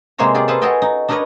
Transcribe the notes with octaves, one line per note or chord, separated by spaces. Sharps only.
C3 G#3 A#3 C5 C#5 A#5
F4 G4 G#4 D5
G#4 A4 B4 C5 F5 A5
F#4 G#4 A4 C#5 D#5 G5
D#4
D4 D#4 A#4 B4 C#5 D#5